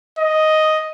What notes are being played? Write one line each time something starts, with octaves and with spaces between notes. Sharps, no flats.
D#5